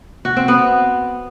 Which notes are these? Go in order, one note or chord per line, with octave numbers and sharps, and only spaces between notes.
F#4
C4
B3